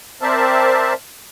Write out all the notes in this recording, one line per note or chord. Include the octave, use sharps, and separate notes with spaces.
C4 A#4 C5 D5 E5 A5